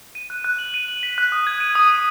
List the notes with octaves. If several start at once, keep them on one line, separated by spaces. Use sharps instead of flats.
D#7
F#6
F#6
F#7
D#7
F#7
B6
F#6
D#6
G#6
D#7
D#6
D#7